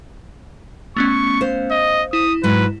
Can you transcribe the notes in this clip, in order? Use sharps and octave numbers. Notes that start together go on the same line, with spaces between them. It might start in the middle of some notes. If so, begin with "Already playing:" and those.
A3 B3 C#4 C#6
C5 F5
D#5
E4 D#6
G#2 F#3 B4